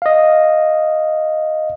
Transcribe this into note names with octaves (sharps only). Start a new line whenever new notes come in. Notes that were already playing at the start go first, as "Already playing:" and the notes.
D#5 F5